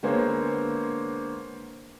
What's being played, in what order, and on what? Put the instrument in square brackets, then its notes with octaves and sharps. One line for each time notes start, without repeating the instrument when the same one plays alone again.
[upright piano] D3 G#3 A#3 B3 C5 C#5